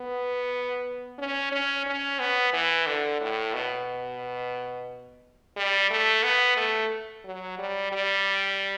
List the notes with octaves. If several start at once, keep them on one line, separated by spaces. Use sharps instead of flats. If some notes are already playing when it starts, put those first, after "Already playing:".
Already playing: B3
C#4
C#4
C#4
B3
E3
D3
A2
B2
G3
A3
B3
A3
F#3
G3
G3